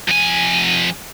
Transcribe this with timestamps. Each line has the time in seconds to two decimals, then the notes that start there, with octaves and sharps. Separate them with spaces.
0.08 F2 G#5